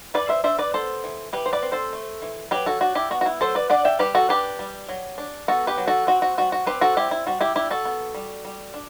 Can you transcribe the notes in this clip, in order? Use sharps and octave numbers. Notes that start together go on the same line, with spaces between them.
E3 B4 D5
C5 E5
D4 C5 E5
B4 D5
B3 A4 C5
E3
E3 G4 B4
C5
B4 D5
C4
A4 C5
A3
E3
F#3 G4 B4
F#4 A4
D4 F#4
E4 G4
B3 F#4
F#4
E4
F#3 A4 C5
B4 D5
D4 D5 F#5
E5 G5
G3 G4 B4
F#4 A4
D4 G4 B4
G3
F#3
D4
B3 F#4 A4
G4 B4
F#3
F#4 A4
C4 F#4
F#4
G3 F#4
F#4
C4 G4 B4
F#4 A4
G3 E4 G4
E4
G3 F#4
E4 G4
D4 E4 G4
F#4 A4
B3
G3
G3
D4